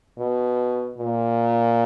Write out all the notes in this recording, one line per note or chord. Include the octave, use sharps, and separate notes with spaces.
B2
A#2